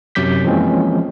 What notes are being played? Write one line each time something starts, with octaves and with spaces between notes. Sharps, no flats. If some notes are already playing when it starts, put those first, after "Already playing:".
F#2 C3 F#3 D6 G6 B6
E3 F3 G#3 A#3 C4 C#4